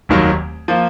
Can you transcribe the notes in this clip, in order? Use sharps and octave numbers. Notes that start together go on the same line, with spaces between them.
F1 D#2 D#3 F#3
F3 A#3 F4